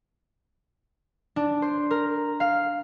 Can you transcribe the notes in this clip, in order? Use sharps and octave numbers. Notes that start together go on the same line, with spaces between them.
D4
C5
A#4
F5